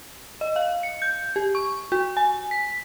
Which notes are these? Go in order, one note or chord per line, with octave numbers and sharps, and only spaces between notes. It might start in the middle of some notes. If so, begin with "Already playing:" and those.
D#5
F5
C#7
G6
G4
C#6
F#4
G#5
B6